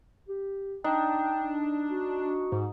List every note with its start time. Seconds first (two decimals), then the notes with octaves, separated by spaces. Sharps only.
0.29 G4
0.84 D4 D#4 G5
1.90 F#4
2.52 G#2